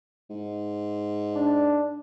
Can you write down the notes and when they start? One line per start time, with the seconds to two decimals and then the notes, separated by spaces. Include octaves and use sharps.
0.30 G#2
1.33 D4